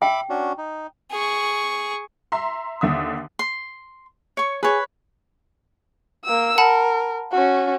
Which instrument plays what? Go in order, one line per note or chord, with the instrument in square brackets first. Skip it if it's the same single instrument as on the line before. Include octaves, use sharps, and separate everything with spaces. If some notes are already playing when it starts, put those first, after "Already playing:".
[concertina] E5 B5 D6 [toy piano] G5
[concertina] C#4 D4 F#4
D#4
[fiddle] G#4 C#6
[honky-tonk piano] E5 A#5 C6
D#2 D3 E5 D#6
[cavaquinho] C6
C#5 C#6
[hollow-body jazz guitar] G#4 [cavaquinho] B4 C#5
[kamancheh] A#3 E6
[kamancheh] A#4 [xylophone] F#5 A5 B5
[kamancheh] C#4 F#4